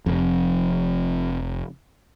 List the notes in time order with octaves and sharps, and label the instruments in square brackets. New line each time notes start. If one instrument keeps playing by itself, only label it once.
[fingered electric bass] F1 F2